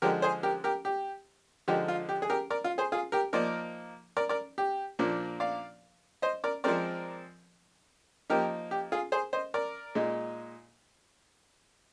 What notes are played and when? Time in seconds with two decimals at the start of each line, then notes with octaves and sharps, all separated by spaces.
0.02 D3 F3 G#3 G4 A#4
0.22 G#4 C5
0.43 G4 A#4
0.64 G4 A#4
0.85 G4
1.68 D3 F3 G#3 D#4 G4
1.88 F4
2.09 G4
2.22 G#4
2.30 G4 A#4
2.50 A#4 D5
2.64 F4
2.78 G#4 C5
2.92 F4 G#4
3.12 G4 A#4
3.33 F3 A#3 D#4 A#4 D5
4.17 A#4 D5
4.29 A#4 D5
4.58 G4
4.99 A#2 F3 A#3 D4
5.40 D5 F5
6.22 C5 D#5
6.44 A#4 D5
6.64 F3 G#3 C4 A#4 D5
8.30 F3 A#3 D#4 G4 A#4
8.71 G4
8.92 F4 G#4
9.12 G#4 C5
9.33 C5 D#5
9.54 A#4 D5
9.95 A#2 G#3 D#4